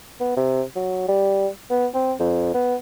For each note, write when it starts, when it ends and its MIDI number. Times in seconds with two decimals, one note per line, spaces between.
0.20 0.33 59
0.37 0.63 48
0.76 1.06 54
1.08 1.47 55
1.70 1.87 59
1.94 2.13 60
2.20 2.53 41
2.54 2.76 59